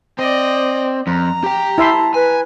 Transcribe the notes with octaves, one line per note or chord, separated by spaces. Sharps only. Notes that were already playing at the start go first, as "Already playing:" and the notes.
C4 D5 D#5
F2 A#5
G4 G5
E4 E5 A5 C6
B4 G#5